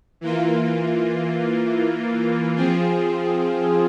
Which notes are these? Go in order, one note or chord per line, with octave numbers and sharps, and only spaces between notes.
E3 A#3 F4
F3 C4 F4 G#4